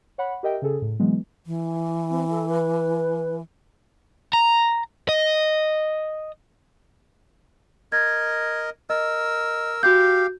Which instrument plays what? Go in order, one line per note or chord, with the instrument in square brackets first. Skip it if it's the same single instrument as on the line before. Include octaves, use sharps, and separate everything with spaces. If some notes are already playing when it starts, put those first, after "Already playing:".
[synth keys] C#5 F#5 B5
G4 A#4 D#5 E5 G5
C#3 G#4 A4
A2
E3 F#3 G#3 B3
[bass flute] E3
[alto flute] C4
A4
B4
[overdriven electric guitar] A#5
D#5
[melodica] A#4 D#5 [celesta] G#6
[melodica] A#4 E6 [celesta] D#5
[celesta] F#4 G6 [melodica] G4 F5